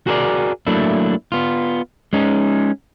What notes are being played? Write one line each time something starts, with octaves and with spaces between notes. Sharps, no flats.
F#4 G#4 A#4 C5 D5
F#3 A3 A#3 D4 E4
B3 F4
G#3 C#4 D#4